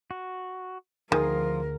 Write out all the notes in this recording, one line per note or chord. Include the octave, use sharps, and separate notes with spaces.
F#4
D2 D#3 F3 F4 G#4 A#4 G#5 D#6